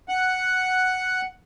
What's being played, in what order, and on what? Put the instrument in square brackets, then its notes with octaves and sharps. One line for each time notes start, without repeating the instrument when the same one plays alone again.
[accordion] F#5